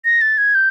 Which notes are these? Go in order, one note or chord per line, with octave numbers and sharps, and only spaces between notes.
A#6
A6
G#6
G6